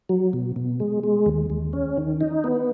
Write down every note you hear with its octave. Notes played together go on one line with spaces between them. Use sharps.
F#3
B2
B2
G#3
G#3
D#2
D#2
C#4
D#3
D#4
B3